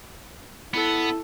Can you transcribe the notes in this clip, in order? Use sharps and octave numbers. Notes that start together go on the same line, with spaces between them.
B3 E4 A4